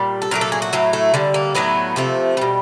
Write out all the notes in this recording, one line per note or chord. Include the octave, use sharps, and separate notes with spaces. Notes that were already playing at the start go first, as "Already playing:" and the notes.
Already playing: A#2 G3
A4
A#2 F#3 A3 A#4
A4
G#4
F#4
A2 F#3 A3
A3
D3 G3
A#3
A2 F#3 A3 B3
C3 F3 A3
B2 G3